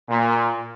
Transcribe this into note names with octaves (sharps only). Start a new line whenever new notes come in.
A#2